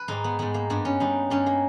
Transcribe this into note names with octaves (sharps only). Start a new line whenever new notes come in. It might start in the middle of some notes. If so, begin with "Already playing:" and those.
Already playing: B4
G#2 G3 D#4
B3
G#2 G3 B3
A#3
G2 G3 B3
C#4
G2 G3 D#4
G2 G3 C#4
A#3